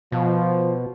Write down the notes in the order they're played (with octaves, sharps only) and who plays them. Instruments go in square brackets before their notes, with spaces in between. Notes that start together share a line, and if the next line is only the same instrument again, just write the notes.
[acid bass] B2 [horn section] F3